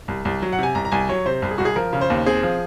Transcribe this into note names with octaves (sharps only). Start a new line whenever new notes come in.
C2
C2
F#3
F#5
C3 G#5
C2 A#5
A#5
C2 G#5
F#3 C#5
C3 C5
C2
G#4
C2 F#4
G#4
F3 A#4
C#3
C5
D#2
C4 G#4
F3